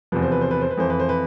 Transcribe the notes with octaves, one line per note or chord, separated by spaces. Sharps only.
E2 C3 F3 B4
C5
B4
C5
B4
C5
B4
F2 E3 C5
B4
C5
B4